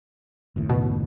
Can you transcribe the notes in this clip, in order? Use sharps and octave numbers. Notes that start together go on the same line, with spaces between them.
F#1 D#2 A2
B2